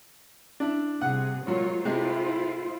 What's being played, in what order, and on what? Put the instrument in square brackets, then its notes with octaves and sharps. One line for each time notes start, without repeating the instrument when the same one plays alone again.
[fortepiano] D4 E4
[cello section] C3 G3 G#4 [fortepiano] F#5
[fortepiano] A#2 F#3 [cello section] G#3 F4 C#5
[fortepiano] C3 G#3 A3 [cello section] E4 F4 C5